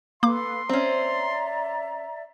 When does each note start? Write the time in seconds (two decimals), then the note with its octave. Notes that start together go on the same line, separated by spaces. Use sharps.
0.23 A#3 A4 B4 F5 C6 D6
0.69 C4 C#4 D5 E5 A#5